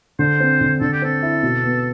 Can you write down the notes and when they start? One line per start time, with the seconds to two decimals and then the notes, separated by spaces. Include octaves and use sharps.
0.19 D3 C5
0.40 C4
0.61 D3
0.81 D3 A4
0.93 G4
1.02 C4 A4
1.22 E4
1.43 B2
1.64 B3